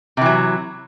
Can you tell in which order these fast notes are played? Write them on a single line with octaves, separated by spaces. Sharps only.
C3 E3 F#3